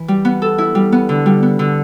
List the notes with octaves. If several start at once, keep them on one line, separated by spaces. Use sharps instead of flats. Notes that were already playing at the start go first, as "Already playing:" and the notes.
Already playing: E3
G3
B3
A4
E4
G3
B3
D3
G3
B3
D3